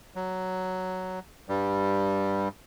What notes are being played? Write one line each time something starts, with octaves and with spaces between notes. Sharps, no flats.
F#3
G2 G3